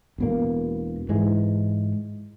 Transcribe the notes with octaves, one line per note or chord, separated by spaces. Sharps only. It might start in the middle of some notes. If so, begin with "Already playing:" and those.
E1 B2 A#3
G#2 E3 G#3